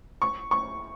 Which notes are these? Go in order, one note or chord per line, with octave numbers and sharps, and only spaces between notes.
C#6
C#6